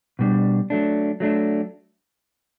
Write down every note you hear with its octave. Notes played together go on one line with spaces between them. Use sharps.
B2 G3 D4
F#3 A3 D4
F#3 A3 D4